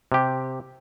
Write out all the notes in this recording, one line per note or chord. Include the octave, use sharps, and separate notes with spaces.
C3 G4